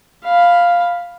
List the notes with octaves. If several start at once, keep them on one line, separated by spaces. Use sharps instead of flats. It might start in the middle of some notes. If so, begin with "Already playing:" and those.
F5 B5